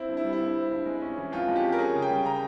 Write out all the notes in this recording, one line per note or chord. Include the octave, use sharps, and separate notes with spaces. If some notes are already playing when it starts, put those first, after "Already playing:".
Already playing: C4 E4
G2
E4
G3
E4
G2
C4
G2
G#3
C#4
E3
F2 F4
G#3
G4
C#4
A#4
C#4 G#4
C#3
G5
G3
C#3 A#5